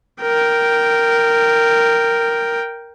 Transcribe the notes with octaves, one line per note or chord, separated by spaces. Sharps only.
A#4 G5